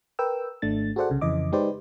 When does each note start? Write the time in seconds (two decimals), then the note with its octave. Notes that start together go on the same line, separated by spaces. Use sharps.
0.19 A#4 B4 G5 E6
0.62 G#1 A3 D4 A6
0.96 F#4 G#4 A4 C5 D5 F#5
1.10 C2 C#3
1.21 F2 C#3 E3 D#5 D6
1.52 G#3 D#4 G4 B4 C5 D5